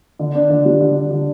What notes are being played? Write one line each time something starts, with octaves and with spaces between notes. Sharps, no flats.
D3
D4
D3
G3
D3
D4
D3